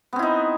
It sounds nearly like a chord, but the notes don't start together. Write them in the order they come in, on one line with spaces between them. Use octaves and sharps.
B3 C4 E4 D#4